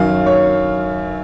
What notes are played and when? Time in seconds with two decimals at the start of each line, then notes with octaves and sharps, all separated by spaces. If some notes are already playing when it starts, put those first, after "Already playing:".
Already playing: F#2 D#3 F#3 F5
0.26 C#5